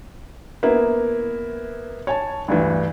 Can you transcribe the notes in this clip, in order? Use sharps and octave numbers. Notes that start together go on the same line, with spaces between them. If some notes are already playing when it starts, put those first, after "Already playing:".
A#3 B3 E4
C#5 G#5 A5
D2 G2 E3